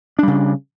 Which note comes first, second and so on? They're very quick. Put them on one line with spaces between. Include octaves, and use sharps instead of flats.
D4 G3 C#3